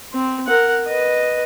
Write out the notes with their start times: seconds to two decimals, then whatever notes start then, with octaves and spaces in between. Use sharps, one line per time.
0.13 C4
0.47 A#4 F#5
0.87 B4 D#5